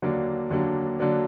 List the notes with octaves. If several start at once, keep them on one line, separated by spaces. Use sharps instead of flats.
D#2 D3 F#3 A#3 D4
D#2 D3 F#3 A#3 D4
D3 F#3 A#3 D4